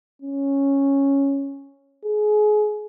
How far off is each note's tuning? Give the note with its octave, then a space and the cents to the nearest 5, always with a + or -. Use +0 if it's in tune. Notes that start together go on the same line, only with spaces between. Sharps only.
C#4 -5
G#4 +25